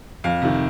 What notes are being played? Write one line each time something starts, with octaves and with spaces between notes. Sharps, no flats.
F2 F5
C3 D#3